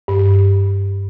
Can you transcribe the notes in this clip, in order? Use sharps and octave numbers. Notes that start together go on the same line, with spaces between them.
G2